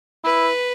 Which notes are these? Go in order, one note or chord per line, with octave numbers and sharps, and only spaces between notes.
E4 B4